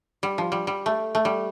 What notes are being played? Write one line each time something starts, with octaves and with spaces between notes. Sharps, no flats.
G3
F3
G3
G3
A3
A3
G3